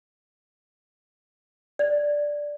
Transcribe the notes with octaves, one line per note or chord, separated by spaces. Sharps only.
D5